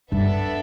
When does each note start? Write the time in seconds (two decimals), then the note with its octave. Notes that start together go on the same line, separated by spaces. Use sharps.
0.12 G2 B3 D4 A4 E5